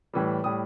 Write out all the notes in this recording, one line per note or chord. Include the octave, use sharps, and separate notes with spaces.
A2 E3 G3
A2 G3 D#6